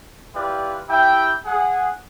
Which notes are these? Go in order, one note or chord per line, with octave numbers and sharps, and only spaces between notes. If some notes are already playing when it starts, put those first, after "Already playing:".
E4 F4 G4 B4 D5
E4 G4 E5 G5
G#4 F#5